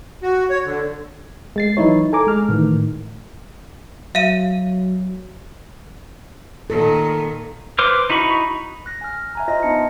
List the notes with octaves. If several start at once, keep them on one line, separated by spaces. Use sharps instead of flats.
F#4
C#5
D3
G#3 A6 C7
E3 F#3 D#4 E4 C#5
A4 G#5 A#5 D6
G#3 F6
A2 D#3 E3
F#3 E5 F5 D#7
A#2 D#3 A4
B4 C5 D6 F6
D#4 E4 F#4 B5 C#6
F#6 A#6
G#5 F6
E5 G#5 A#5
F4 C5 D#5 F6 A#6
B3 D4 D#4 D#5 A5 C#7